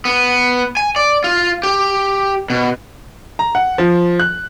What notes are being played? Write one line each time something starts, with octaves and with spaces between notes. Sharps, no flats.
B3
G#5
D5
F4
G4
B2
A#5
F#5
F3
F#6